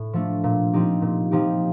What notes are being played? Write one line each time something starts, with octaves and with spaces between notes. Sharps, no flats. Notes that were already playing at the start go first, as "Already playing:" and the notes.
Already playing: A2
F3 A3 D4
A#2
F3 C4 D#4 G4
A#2
F3 C4 D#4 G4